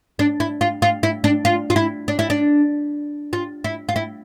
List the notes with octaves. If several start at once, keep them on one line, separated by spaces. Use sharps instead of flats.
D4
E4
F4
F4
E4
D4
F4
F4
E4
D4
E4
D4
F4
E4
F4
E4